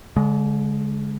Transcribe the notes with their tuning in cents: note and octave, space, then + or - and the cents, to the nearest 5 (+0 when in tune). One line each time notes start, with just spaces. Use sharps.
D3 -40 G#3 +0